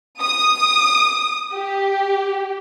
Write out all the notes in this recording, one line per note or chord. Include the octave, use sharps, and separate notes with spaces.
D#6
G4